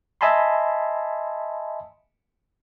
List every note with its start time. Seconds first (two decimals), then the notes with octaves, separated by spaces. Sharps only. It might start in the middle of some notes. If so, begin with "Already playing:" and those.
0.21 D#5 E5 G#5 A5 B5 C6